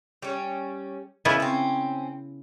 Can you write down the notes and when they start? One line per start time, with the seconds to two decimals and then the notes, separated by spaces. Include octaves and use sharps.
0.22 G3 C#4
1.25 C#3 G#3 B3 E4
1.40 C4 C#4